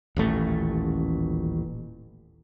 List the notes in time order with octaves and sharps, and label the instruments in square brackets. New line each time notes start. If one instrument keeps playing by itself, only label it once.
[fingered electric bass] D#1 A1 A3